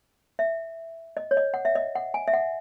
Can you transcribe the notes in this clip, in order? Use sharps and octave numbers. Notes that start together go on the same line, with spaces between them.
E5
D#5
C#5
D#5
F#5
E5
D#5
F#5
G#5
E5
F#5